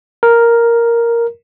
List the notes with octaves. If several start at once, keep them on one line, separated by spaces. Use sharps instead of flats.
A#4